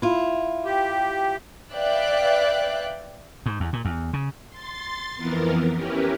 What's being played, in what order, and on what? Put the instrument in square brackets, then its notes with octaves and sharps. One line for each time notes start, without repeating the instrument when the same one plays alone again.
[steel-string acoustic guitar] E4 F4
[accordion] G4
[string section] B4 D5 E5 F5 G5 F#6
[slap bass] G#2
E2
A#2
E2
C#3
[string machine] C6 A6
F2 E3 B3 A#4
C#4 E4 G4 A#4 B4